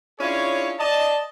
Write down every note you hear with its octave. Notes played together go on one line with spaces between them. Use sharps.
C#4 D4 E4 F4 G#4 C#5
D5 D#5 A5